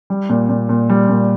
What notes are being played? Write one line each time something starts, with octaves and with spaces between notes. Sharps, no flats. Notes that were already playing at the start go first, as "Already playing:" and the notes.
G3
A#2
A#2
A#2
G3
A#2